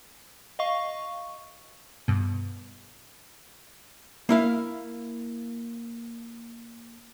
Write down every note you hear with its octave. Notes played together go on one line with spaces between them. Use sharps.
D#5 F5 C#6
G2 B2
A#3 E4 F5